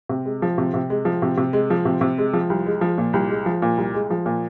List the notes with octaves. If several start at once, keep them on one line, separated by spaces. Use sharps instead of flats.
C3
G#3
F3
C3
C3
G#3
F3
C3
C3
G#3
F3
C3
C3
G#3
F3
C2
G#3
F3
A#2
C2
G#3
F3
A#2
C2
G#3
F3
A#2